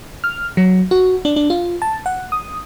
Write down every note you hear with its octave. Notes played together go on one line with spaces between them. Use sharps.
F6
F#3
F#4
D4
D4
F4
A5
F#5
D#6